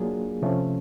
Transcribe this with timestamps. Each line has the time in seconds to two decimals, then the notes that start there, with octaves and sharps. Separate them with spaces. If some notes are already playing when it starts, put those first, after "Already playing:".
Already playing: F#3 A#3 D4 F4 G#4
0.42 C3 F3 A3 C#4